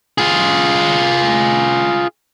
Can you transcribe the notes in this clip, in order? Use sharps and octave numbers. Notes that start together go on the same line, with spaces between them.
F4 G#4